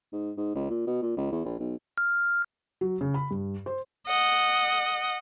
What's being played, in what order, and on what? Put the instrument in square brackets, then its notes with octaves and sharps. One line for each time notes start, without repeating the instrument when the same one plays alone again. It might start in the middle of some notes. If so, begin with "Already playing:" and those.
[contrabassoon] G#2
G#2
C#2
A#2
B2
A#2
C#2
E2
A#1
B1
[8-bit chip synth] F6
[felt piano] F#3
C#3
B5
G2
C5
[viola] D#5 F#5